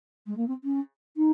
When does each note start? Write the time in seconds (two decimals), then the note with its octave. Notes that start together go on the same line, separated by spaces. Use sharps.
0.26 G#3
0.36 A#3
0.47 C4
0.64 C#4
1.17 D#4